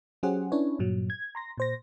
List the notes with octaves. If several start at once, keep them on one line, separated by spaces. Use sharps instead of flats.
F#3 C#4 G4 G#4 C5 F#5
C#4 D4 E4 B4 C#5
G2 A#2 F#3
G#6
A#5 C6 A#6
A#2 C5 A#6